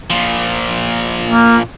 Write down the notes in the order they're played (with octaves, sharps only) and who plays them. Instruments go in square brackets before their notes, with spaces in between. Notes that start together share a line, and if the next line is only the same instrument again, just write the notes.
[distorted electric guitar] A#2 F3
[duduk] A#3